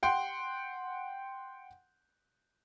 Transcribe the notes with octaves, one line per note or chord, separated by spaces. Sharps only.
F#5 G5 C6